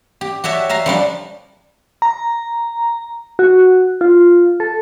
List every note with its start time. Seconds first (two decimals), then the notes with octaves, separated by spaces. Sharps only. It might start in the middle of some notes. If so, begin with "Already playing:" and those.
0.21 G4
0.44 F#4 G4 C#5 E5 A5
0.69 E5 F5 A#5
0.86 F3 G3 D4 F4
2.02 A#5
3.39 F#4
4.01 F4
4.60 A4